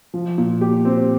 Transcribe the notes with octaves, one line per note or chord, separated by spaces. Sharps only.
F3
A#2
G4
C4